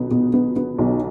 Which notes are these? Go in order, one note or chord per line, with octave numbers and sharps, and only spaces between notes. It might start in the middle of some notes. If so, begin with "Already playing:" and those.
Already playing: B1 B2 B3
B2
B3
B3
B1